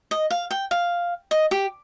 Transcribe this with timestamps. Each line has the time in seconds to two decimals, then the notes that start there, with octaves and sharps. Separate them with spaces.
0.11 D#5
0.30 F5
0.51 G5
0.71 F5
1.31 D#5
1.51 G4